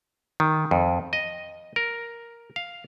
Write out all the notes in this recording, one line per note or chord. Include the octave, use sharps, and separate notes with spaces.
D#3
F2
D#5
A#4
F5